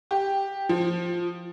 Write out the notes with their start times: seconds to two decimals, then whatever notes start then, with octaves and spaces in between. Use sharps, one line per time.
0.11 G4
0.69 F3